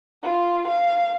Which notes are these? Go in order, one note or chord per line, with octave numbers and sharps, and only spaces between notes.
F4
F5